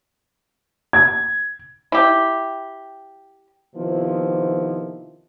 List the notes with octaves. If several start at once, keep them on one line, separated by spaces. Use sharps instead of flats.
G#6
E4 G4
C3 D#3 F3 B3 E4